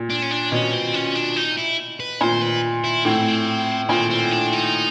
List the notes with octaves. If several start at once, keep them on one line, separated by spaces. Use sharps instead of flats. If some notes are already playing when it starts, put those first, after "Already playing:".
Already playing: A#2
D4
C#4
D4
B2 C#4
C4
C#4
D4
D#4
E4
B4
A#2 C5
B4
E4
A2 C4
A#2 C4
C4
D4
D#4